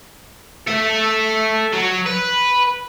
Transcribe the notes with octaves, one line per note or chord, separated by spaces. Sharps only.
A4 E5
F#3
B4